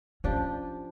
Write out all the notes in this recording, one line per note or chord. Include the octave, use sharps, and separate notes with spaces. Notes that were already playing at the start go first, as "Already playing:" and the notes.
F3 C#4 D4 G4